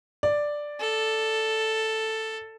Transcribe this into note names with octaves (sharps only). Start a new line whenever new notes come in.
D5
A4